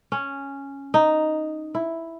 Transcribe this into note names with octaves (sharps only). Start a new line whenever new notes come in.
C#4
D#4
E4